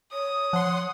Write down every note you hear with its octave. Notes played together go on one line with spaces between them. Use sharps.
C#5 D#6
F3 F#5 C6